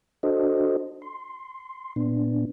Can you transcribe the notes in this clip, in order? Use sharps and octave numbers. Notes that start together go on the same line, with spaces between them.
D4 F#4 A4 C5 D#5
C6
A#2 B3 D4